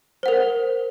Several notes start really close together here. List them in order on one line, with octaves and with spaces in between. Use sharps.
C5 F#5 A#4